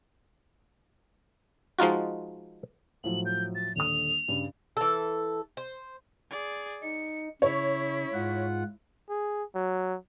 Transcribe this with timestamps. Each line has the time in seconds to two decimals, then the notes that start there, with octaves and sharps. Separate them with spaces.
1.79 F3 G#3 D#4 F4 F#4
3.04 A2 F3 F#3 F#7
3.26 G6
3.55 A6
3.76 D#1 D3 D#6 F7
4.28 G2 C#3
4.77 E3 A4
5.57 C5
6.30 G#4 D5
6.83 D#4 C#7
7.42 C#3 E4 C#5 B6
8.14 G#2 F4 F#5
9.09 G#4
9.55 F#3